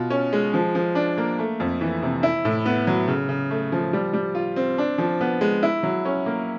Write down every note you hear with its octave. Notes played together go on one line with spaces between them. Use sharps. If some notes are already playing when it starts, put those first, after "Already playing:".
Already playing: B2 F4
C#4
G#3
F3
F3
D4
A#3
A3
F2
E3
C3
E4
A2
B3
F#3
C#3
C#3
A3
F3
G3
G3
F4
C4
D4
F3
B3
G#3
E4
F#3
C#4
A#3